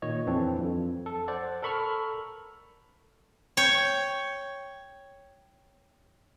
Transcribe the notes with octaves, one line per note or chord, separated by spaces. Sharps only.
A#2 D#3 C#5 D#5
F2 E3 C4 D4
F2 F3
A4
C5 D5 F#5
A4 A#4 B5 C#6 E6 F6
C#5 G5